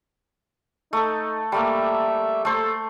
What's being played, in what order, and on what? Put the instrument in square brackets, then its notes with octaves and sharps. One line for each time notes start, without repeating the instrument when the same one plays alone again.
[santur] A3 A4 [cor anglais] D#4
[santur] G3 A3 A#3 [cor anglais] E5
[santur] A3 C5 [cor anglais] A4